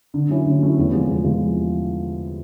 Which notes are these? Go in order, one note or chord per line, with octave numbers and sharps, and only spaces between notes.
D3
F#3 A3 C#4 E4
D3
F#3 A3 C#4 E4
E2
C3 F3 G#3
E2
C3 F3 G#3